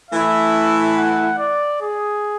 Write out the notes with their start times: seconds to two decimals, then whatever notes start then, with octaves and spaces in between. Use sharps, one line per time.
0.11 E3 A3 E4 E5
0.97 F#5
1.39 D5
1.81 G#4